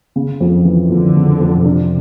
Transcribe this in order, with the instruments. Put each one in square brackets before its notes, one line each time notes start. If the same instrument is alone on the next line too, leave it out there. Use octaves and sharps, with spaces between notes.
[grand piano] C#3
F2
E3
[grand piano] F2 [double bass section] D3
[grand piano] C#3
F2
[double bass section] C3 [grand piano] D4